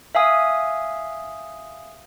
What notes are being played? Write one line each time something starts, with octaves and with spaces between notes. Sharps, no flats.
E5 F5 G#5 D#6